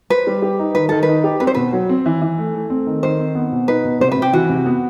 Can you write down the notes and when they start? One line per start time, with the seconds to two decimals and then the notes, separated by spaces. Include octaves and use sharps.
0.10 B4 C5
0.27 G3
0.42 G4
0.59 D#4
0.75 D#3 B4
0.89 D#3 A4
1.03 B4
1.08 D#4
1.24 G4
1.40 C4 B4
1.47 C5
1.55 B2 B4
1.73 F#3
1.89 C4
2.06 E3
2.22 E3
2.38 A3
2.54 A3
2.70 C4
2.86 D#3
3.03 D#3 C5
3.19 C4
3.35 B3
3.52 B2
3.68 D#4 B4
3.85 B2
4.00 C3 C5
4.12 B4
4.17 C3
4.22 G4
4.33 E3 F#4
4.49 C3
4.66 B3